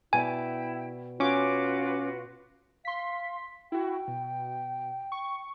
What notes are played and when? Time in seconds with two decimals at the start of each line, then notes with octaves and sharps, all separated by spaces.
0.13 B2 E4 D5 G5 G#5
1.20 C#4 F4 F#4 B4 D6
2.85 F5 C6 B6
3.72 E4 F#4 G5
4.08 B2
5.12 C#6